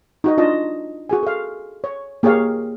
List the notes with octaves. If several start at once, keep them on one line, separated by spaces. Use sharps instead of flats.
D#4 F#4 D#5
D4 F4 D#5 A5
F#4 G#4 G#5
A4 F5
C#5
A#3 G4 G#4 C#5 F5